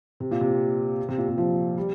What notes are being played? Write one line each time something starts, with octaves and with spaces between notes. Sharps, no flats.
C3
A#2
C3
C3
A#2
C3
F3
G3